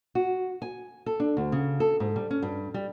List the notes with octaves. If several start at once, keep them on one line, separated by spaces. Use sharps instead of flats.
F#4
G#5
A4
D4
D2
C#3
A4
G#2
G3
C#4
G2
G3